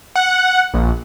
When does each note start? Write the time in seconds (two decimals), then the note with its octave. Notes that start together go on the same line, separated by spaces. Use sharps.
0.16 F#5
0.74 A#1